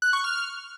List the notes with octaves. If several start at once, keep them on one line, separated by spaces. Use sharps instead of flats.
F#6
C#6
F6